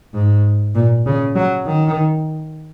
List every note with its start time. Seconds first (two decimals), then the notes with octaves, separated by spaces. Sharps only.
0.14 G#2
0.75 A#2
1.06 C#3
1.36 F#3
1.66 D#3